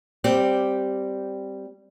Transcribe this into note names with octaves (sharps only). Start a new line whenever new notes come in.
G3 C4 G4